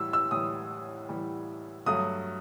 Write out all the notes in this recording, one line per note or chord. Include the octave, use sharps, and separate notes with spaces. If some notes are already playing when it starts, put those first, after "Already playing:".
Already playing: A2 E3 G3 E6
E6
A2 E3 G3 D#6
A2 E3 G3
G2 F#3 A3 D#6